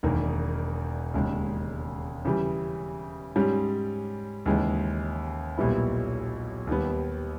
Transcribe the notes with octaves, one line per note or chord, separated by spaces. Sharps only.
E1 E2 D#3 A#3
E1 D#2 C#3 G#3
C#3 E3 G3
G#2 G3 C#4
D#2 C#3 E3 G#3
B1 A#2 G3 B3 E4
D#2 D#3 G3 B3